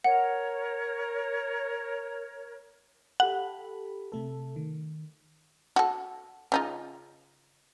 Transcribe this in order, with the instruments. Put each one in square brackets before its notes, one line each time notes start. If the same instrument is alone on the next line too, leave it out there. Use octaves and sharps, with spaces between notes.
[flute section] A#4 C#5 [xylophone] F#5
[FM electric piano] G4 A4 B5 [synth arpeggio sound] F#5
[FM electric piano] C3 A3 A4
D#3
[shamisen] F#4 A4
C#3 D#4 F4